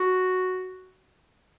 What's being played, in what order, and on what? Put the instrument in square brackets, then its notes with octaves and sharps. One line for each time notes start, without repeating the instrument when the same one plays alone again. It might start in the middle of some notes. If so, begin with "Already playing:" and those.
Already playing: [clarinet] F#4